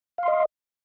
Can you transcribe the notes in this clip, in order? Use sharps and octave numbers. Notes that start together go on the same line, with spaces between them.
D#5 F5 C6